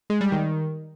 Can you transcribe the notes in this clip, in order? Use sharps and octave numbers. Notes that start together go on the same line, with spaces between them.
G#3
G3
D#3